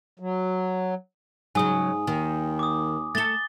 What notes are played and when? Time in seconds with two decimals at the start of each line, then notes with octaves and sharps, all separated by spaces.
0.20 F#3
1.55 G#2 C#3 F#3 G#5 D#6
2.07 D#2 D#3
2.59 D6 D#6
3.15 A3 A4 A6 G7